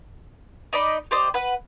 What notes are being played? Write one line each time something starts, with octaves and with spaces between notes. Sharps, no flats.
D#4 D5 D#5 B5
G4 C5 D5 D#5
B4 F#5